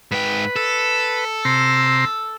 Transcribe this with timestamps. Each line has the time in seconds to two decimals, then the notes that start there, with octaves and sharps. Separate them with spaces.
0.12 G#2 B4 G5
0.56 A4
1.45 C3 A#5 C6